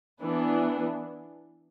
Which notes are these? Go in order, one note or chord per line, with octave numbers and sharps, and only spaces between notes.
E3 B3 D4